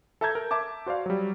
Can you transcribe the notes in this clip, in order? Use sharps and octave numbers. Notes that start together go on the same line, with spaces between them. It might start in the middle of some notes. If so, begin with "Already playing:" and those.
A4 E5 A5 A#5 G6 G#6
A#4
E5 A5 D6
F#4 C5 D5 F5
F#3 G3